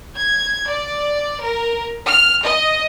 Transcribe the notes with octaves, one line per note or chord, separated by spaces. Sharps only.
G#6
D5
A#4
F6
D#5